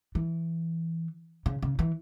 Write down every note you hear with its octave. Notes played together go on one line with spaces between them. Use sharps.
E3
C#3
C#3
E3